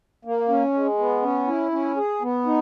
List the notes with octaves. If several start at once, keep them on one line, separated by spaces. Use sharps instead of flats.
A#3
C#4
G#3
B3
C#4
E4
C#4
G#4
B3
D#4